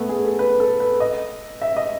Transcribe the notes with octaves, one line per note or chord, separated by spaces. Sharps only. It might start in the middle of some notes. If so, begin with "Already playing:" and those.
Already playing: A3 B3
G#4
A4
B4
A4
B4
D#5
E5
D#5